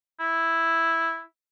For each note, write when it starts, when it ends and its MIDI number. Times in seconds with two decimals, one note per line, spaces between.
0.20 1.21 64